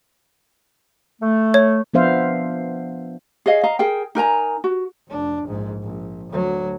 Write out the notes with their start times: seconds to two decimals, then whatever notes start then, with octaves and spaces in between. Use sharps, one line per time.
1.21 A3
1.54 C#5
1.94 F3 B3 D4 C5 E5 F5
3.46 G#4 C#5 D#5 F5
3.64 D#5 F5 A#5
3.79 G#4 A#4 G5
4.15 D#4 A#4 G#5 A#5
4.64 F#4
5.08 F1 D4
5.44 A#1 G#2
5.83 A#1
6.30 D2 F#3